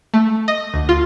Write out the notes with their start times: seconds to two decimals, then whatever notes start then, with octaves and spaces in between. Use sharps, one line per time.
0.14 A3
0.48 D#5
0.74 D2
0.89 F4